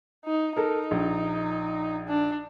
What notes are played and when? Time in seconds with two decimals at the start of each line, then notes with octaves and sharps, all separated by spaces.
0.25 D#4
0.57 D#4 A4 A#4
0.91 A#1
2.08 D4